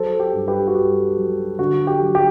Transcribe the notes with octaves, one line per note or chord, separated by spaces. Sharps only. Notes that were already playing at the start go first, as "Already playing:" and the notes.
Already playing: F#3 A4 C5
G4
G2
G4 B4
F#4
G2 G4
F#3
D3 F#4
G4
F#3
G4